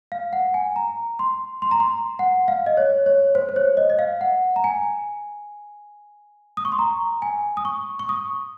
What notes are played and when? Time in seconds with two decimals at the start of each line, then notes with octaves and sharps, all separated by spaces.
0.12 F5
0.33 F#5
0.54 G#5
0.76 A#5
1.19 C6
1.62 C6
1.71 A#5
1.80 C6
2.19 F#5
2.48 F5
2.66 D#5
2.77 C#5
3.06 C#5
3.35 C5
3.49 C5
3.56 C#5
3.77 D#5
3.90 D#5
3.99 F5
4.21 F#5
4.56 A#5
4.64 G#5
6.57 D#6
6.65 C#6
6.72 C6
6.79 A#5
7.22 G#5
7.57 D#6
7.65 C#6
7.99 C#6
8.09 D#6